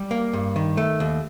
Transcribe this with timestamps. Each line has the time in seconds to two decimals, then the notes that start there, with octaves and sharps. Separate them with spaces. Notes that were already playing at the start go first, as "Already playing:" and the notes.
Already playing: G3
0.11 A#3
0.33 G2
0.56 D#3
0.77 A3
1.00 D#2